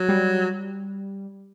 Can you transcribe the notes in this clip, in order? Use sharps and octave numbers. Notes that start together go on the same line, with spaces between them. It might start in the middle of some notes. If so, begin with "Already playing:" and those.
Already playing: F#3
G3